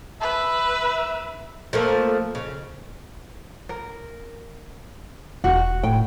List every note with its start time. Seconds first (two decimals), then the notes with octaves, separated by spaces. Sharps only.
0.21 B4 E5
1.73 F3 A3 A#3
2.35 C#3
3.69 A#4
5.44 E1 F#4
5.83 A2 G5